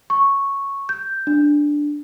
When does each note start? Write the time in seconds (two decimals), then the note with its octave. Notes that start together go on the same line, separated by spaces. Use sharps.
0.10 C#6
0.89 G6
1.27 D4